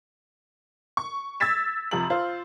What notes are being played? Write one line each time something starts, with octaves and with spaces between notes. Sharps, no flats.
C#6
E6 G#6 A6 B6 E7
F2 C3 F#7
F4 C5